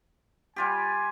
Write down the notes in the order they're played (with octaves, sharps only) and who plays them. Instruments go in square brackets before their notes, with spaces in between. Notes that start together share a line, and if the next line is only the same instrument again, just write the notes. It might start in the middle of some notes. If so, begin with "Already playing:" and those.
[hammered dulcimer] G3 F4 G4 [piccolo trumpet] G#5